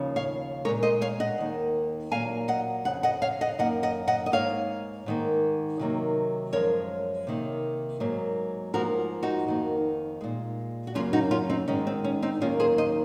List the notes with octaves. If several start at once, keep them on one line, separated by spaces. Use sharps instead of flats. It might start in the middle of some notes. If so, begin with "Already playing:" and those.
Already playing: D#2 C#3 F3
C#5 F5
A#2 G#3 A#4 C#5
C5 D#5
C#5 F5
D#5 F#5
D#2 D#3 A#3
A#2 F#3 A#3 F5 G#5
D#5 F#5
F2 C#3 F#5
D#5 F#5
C#5 F5
D#5 F#5
F#2 D#3 A#3 D#5 F#5
D#5 F#5
D#5 F#5
D#5
G#2 F3 A#3 C#5 F5
G#2 D#3 A#3
C3 D#3 F#3 A#3
F#2 F3 G#3 A#4 C#5
C3 D#3 A#3
G#2 F#3 A#3
G#2 F3 A#3 F#4 A#4
D#4 F#4
F2 D#3 A#3
A#2 G#3
F#4
F#2 C#3 F#3 A#3 C#4 F4
D#4 F#4
C#4 F4
C4 D#4
G#2 D#3 G#3 C#4
C4
C#4
C4 D#4
D#2 D#3 F#3 A#3 C#4 F4
G#4 C5
C5 D#5